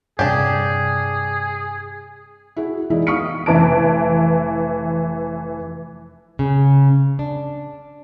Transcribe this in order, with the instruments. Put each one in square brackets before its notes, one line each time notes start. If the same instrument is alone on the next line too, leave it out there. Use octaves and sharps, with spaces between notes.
[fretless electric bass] G2 C3 [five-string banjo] D4 G4 [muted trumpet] G#4
[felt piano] E4 F#4 G#4
E3 G#3 D#4 E4 D5 D#5
F5 C#6 D#6 F6 B6 C#7
[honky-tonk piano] F1 E3 A5 D7
[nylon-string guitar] C#3
D4